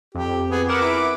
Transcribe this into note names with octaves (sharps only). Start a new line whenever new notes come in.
F2 G4
B3 G#4
A#4 B4 F#5 D6 E7
E4 D7